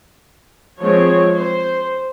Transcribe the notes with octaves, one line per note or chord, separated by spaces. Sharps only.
F3 G#3 C4 C#5
C5